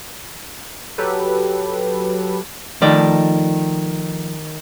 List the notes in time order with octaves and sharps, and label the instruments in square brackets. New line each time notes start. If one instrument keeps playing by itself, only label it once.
[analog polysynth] F#3 G4 A4 B4
[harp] D#3 [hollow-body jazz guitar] F3 A3 D5